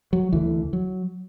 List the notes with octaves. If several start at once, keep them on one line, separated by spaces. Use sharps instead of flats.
F#3
D2 D3 E3
F#3